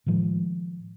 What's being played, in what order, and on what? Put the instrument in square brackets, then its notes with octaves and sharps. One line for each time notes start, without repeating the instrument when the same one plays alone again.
[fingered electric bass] A2 D#3 F3 G#3